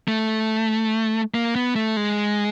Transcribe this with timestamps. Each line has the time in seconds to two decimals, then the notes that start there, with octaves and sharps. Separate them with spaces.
0.08 A3
1.34 A#3
1.55 B3
1.75 A3
1.97 G#3